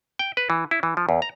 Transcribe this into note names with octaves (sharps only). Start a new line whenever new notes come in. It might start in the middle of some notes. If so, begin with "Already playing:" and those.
G5
B4
E3
E4
E3
F3
E2
A#5